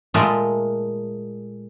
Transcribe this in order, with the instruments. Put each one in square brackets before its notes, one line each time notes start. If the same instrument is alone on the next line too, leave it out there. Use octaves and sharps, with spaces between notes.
[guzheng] A#2 G#3 A3 F4 D#5 G5